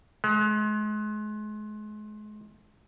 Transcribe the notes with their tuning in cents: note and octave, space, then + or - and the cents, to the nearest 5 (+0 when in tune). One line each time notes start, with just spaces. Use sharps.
G#3 +35